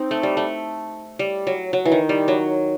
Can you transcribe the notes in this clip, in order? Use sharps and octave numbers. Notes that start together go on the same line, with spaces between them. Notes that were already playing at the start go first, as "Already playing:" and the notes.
Already playing: C4 D#4
A3
G3
A3
G3
F#3
F#3
E3
D#3
G3
F#3